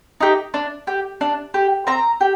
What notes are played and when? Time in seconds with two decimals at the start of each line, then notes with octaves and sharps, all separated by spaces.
0.21 D#4 G4
0.54 D4
0.87 G4
1.21 D4
1.54 G4
1.87 C4 A#5
2.21 G4